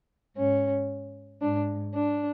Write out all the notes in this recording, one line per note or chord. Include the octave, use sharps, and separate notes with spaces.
G#2 C#4
G#2 D4
D4